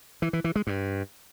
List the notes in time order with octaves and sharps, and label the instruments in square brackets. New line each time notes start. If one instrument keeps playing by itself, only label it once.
[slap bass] E3
E3
E3
G#3
G2